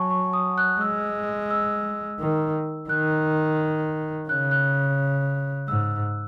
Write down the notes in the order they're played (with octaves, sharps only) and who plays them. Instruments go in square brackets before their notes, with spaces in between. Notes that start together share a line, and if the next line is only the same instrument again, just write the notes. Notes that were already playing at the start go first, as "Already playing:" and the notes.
Already playing: [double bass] F#3 [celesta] F#5 G#5 A5 C#6
[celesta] C#6
D#6
F#6
[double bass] G#3 [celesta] E6
[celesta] E6
[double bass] D#3
[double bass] D#3 [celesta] F#6
[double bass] C#3 [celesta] F#6
[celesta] F#6
[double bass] G#2 [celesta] E6